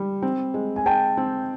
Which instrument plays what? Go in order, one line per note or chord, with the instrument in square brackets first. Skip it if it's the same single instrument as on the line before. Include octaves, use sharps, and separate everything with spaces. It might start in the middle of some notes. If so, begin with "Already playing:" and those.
Already playing: [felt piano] G3
C4
G#3
[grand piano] G#5
[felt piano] G#3 [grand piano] G5 A5
[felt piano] C4